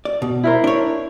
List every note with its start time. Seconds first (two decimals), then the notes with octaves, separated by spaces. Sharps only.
0.05 D5
0.22 B2
0.43 E4 A#4 C5
0.64 D4 C#5